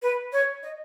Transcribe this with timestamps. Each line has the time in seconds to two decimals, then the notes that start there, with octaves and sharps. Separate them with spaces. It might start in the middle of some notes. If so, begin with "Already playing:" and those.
0.02 B4
0.33 C#5
0.63 D#5